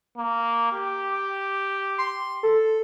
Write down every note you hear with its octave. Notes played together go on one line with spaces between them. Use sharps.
A#3
G4
C6
A4